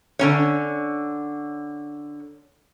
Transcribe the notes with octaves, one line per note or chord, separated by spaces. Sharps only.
D3 C#4 C#5